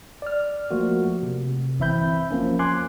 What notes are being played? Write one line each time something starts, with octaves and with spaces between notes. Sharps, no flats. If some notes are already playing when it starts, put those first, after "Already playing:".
D5 F6
F3 A3 A#3 F4 F#4
C3
G1 E3 C4 E5 B5 G6
F3 A#3 C#4
G#5 C6 D6 F#6 G#6